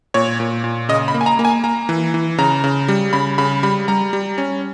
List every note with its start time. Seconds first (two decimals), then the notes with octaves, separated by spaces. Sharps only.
0.14 A#2 C#5
0.40 A#2
0.64 A#2
0.89 C#3 D#5
1.08 B5
1.14 A#3
1.21 G#5
1.26 A#5
1.39 A#3
1.45 G#5
1.64 A#3 A#5
1.89 E3
2.14 E3
2.38 C#3 A#5
2.64 C#3
2.88 G3
3.13 C#3 B5
3.38 C#3 B5
3.63 G3 B5
3.88 G3 A#5
4.13 G3
4.38 C#4